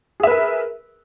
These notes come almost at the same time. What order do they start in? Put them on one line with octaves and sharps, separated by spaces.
G#4 E5 B4 A#4